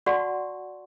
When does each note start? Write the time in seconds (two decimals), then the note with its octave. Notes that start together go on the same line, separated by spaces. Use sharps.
0.06 F#4 D5 F#5 A5 C6 C#6